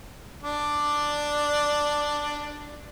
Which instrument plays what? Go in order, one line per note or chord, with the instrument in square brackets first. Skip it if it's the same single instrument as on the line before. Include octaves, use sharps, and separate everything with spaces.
[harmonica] D4 D5